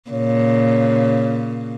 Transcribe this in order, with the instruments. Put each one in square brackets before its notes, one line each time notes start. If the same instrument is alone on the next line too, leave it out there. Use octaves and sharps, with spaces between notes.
[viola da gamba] A#2 C#3 [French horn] C#5